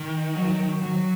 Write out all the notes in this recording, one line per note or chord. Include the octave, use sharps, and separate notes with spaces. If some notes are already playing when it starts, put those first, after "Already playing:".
Already playing: D#3
F#3
F#3